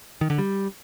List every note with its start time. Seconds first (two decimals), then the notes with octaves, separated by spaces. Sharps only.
0.21 D#3
0.30 D3
0.38 G3